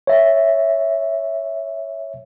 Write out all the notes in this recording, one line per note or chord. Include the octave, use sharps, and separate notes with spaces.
C#5 E5